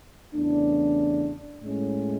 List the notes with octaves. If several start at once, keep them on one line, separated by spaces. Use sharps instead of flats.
E2 C#3 E3 A3 D4
A2 G#3 C#4